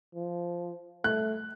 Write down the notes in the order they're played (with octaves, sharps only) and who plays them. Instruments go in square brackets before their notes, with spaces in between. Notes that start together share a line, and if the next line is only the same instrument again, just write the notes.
[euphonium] F3
[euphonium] A3 [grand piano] F#6